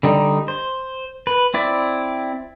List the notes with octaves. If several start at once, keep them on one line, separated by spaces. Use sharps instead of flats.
D3 G3 D#4
C5
B4
C4 E4 D5